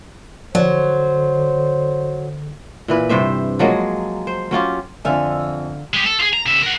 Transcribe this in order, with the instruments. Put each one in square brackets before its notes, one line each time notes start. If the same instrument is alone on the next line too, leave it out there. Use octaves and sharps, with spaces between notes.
[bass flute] D3 [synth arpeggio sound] F3 D5 [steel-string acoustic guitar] F#3 [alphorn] C5
[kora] A#2 E3 B4
G2 C3 C5 E5
F3 F#3 G#3 A#3
C5
F#3 C#4 F4 G4
[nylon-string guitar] F2 E5 G#5 [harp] D3 F5
[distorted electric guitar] G#3 G4
A4
F4 G#4
A#5
C#3 E5
A#4 F#5